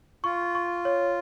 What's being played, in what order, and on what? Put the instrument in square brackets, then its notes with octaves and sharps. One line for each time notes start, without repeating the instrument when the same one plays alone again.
[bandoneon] F4 [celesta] C#6
[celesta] C#6
C#5